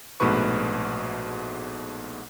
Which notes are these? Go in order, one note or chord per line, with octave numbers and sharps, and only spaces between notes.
A#1 G#2 B2 A3 B4 C#6